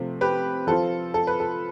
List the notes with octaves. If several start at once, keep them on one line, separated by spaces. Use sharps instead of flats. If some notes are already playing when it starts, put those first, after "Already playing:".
Already playing: C3 F3 A3
G4 B4
F3 C4 F4 A4
A4
B4
A4